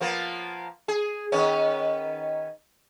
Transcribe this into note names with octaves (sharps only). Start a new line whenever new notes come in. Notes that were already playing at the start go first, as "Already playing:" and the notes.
F3 A#3 B3
G#4
D#3 B3 C#4